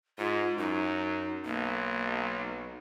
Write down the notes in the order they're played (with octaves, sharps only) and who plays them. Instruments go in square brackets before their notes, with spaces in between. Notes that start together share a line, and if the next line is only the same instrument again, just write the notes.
[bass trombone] G#2 [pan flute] F4
[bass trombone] F#2 [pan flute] D#4
[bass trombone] B1 [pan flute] A#3